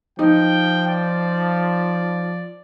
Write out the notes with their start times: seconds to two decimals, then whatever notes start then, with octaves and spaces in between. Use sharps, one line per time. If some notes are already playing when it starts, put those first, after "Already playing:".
0.19 F3 D#4 G5
0.88 D5